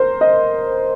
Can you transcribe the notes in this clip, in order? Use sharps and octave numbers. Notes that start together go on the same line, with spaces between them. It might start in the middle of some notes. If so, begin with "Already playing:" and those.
Already playing: A#4 C5
D#5